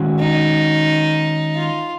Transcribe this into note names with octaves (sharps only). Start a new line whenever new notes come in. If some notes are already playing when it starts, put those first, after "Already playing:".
Already playing: D#3 G#3 C#4 F#4
D#4
F4